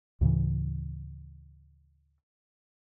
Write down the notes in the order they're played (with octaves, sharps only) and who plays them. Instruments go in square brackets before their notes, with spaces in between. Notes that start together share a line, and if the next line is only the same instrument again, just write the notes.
[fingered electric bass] D2 A2 C#3 E3